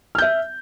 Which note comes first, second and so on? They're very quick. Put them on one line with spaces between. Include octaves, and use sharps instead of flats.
F6 G6 E5